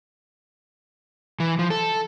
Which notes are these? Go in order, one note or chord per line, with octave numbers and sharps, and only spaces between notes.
E3
F3
A4